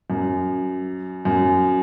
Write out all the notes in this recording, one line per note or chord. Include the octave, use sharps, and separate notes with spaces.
F#2
F#2